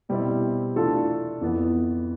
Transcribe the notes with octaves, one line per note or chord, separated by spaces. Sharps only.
B2 G3 C4 E4
E3 A3 D4 F4 A4
F2 E3 B3